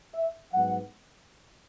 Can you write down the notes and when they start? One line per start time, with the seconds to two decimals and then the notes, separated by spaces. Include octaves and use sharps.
0.14 E5
0.52 G#2 F#3 B3 F#5